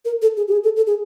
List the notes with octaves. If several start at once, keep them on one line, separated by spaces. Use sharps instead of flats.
A#4
A4
G#4
G4
G#4
A4
A4
G#4